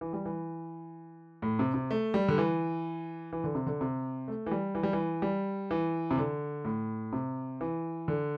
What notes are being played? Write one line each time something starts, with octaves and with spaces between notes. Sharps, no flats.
E3
G3
E3
A2
C3
C3
A3
G3
D3
E3
E3
D3
C3
D3
C3
A3
E3
G3
E3
G3
E3
G3
E3
C3
D3
A2
C3
E3
D3